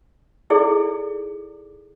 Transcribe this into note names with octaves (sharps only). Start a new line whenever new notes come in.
D#4 E4 G#4 A4 D5